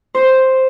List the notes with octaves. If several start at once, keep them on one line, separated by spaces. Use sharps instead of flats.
C5